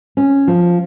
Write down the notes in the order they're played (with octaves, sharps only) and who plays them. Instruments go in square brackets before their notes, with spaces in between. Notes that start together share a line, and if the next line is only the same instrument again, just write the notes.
[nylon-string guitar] C#4
F3